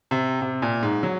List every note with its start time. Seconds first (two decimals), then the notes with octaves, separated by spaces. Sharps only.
0.11 C3
0.42 C3
0.62 A#2
0.83 G#2
1.03 F#3